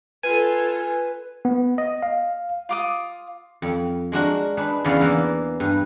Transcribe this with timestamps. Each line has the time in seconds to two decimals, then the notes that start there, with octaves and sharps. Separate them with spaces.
0.23 F4 A4 B4 G#5
1.45 B3
1.78 D#5
2.03 F5
2.69 F4 D6 D#6
3.62 F2
4.12 G#3 D4 F#4 A#4
4.57 D4 G#4 B4
4.84 E2 C#3 B3 D5 F5
5.00 E3 A#3 B3
5.60 G2